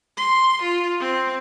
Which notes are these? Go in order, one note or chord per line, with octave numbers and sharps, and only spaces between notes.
C6
F4
C4